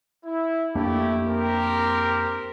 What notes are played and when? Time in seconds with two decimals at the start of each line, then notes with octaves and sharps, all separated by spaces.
0.25 E4
0.75 F2 A3 A#3 D4 E4 G4
1.27 C4 G4 A#4